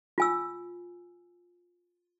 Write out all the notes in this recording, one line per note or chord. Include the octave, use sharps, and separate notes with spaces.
F4 G#5 E6